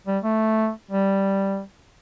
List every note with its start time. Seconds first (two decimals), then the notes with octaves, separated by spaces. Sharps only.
0.07 G3
0.24 A3
0.91 G3